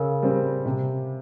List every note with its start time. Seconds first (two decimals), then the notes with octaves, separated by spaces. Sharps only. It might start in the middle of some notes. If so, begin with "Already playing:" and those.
Already playing: C#3 A#4
0.22 G3 C4
0.65 C3